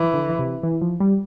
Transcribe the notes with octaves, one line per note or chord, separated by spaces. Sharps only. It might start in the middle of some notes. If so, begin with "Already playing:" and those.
Already playing: E3
D3
C3
E3
F3
G3